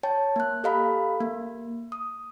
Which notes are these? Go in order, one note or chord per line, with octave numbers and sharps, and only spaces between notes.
C#5 G5 A5
A#3 F#6
G4 A4 D#5 F5 A#5 B5
A#3
D#6